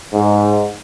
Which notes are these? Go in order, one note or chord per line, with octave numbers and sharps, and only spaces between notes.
G#2